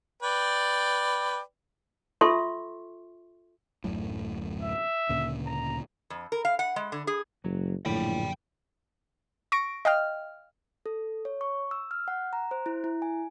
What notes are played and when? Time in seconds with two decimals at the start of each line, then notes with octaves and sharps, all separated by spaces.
0.22 B4 D5 G5
2.21 F4 A4 E5 C6 C#6
3.84 D1 F#2 A2
4.63 E5
5.09 D2 A#2 C#3
5.46 A#5
6.10 F2
6.32 A#4
6.45 F5
6.59 F#5
6.76 G#3
6.92 D3
7.07 G#4
7.44 F#1 F#3
7.86 A#1 F#2 A2 D3 G5 B5
9.52 C#6 A#6 D7
9.85 D#5 F5 G5 F6
10.86 A4
11.25 C#5
11.41 C#6
11.71 E6
11.91 F6
12.08 F#5
12.33 A#5
12.51 C5
12.66 E4
12.84 E4
13.02 G#5